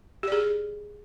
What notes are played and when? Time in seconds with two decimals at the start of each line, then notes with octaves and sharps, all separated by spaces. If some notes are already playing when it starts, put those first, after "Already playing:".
0.23 G4
0.28 D5
0.32 G#4